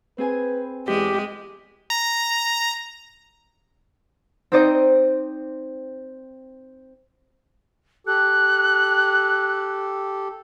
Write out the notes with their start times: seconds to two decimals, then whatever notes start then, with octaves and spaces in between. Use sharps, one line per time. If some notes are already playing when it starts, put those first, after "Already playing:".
0.18 C4 G#4 B4 G#5
0.88 E2 G#3 G4
1.90 A#5
4.52 C4 D#4 C5 D5 D#5
8.07 G4 A4 F#6